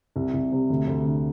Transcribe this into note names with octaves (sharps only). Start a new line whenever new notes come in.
C2
C2
C3
D2
D2
D3